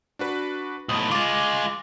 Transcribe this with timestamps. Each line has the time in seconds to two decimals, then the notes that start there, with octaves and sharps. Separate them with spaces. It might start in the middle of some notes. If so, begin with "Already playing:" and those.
0.19 D4 F#4 B4
0.89 B1 A2 D#6
1.11 G#3 F4 D6 A6